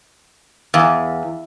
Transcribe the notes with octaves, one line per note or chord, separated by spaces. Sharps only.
E2 F5